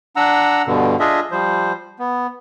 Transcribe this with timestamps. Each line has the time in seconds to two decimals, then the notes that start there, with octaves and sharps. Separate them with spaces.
0.16 D4 F#5 A#5 E6
0.67 G2 B2 D3
1.00 D4 F4 G#4 D#5 E5
1.31 F3 G3 C5
1.99 B3